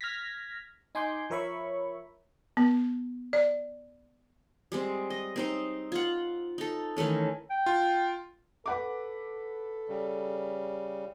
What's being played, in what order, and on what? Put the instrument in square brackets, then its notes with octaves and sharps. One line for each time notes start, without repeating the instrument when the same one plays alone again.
[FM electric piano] F6 G#6 A#6 B6
D#4 G#5 C6 D6 G6
F3 A#4 C#5 E5 B5 C#6
[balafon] B3
D5
[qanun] G3 G#3 C4
D#5
C4 D#4 C5
F4 F#5
D#4 A4
D#3 E3 A3 C#4
[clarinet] G5
[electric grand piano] F4
[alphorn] A4 [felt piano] B4 F#5 D6
[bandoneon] C#3 G3